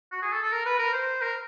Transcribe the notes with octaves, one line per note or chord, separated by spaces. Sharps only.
F#4
G#4
A4
A4
A#4
B4
A#4
C5
A#4